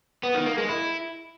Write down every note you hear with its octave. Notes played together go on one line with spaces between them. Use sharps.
B3
D#3
A#3
G#3
E4